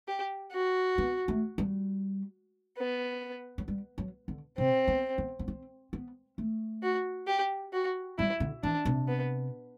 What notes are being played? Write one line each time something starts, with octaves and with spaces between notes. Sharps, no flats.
G4
F#4
B3
A3
G3
B3
F#3
G3
F#3
D3
C3 C4
B3
B3
B3
C4
B3
A3
F#4
G4
F#4
G3 E4
D3
E3 D4
C3
B3